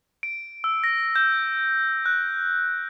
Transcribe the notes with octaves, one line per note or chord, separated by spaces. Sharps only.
D7
E6
A#6
G6
F#6